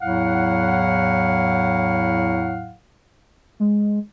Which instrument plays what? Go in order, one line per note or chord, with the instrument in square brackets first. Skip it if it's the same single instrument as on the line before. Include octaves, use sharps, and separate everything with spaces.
[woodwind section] E2 A2 F#3 E4 F5 F#5
[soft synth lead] G#3